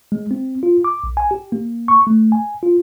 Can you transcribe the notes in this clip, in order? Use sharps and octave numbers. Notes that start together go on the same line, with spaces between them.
G#3
C4
F4
D6
B1
G#5
G4
A#3
C#6
A3
G#5
F4